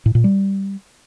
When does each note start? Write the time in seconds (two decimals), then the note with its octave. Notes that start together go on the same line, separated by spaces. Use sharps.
0.06 A2
0.15 A#2
0.24 G3